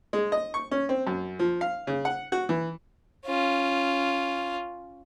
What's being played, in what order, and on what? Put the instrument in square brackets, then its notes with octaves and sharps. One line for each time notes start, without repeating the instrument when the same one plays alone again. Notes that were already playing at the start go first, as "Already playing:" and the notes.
[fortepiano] G#3
D#5
C#6
C#4
C4
F#2
F3
F5
C#3
F#5
F#4
E3
[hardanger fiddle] C#4 F4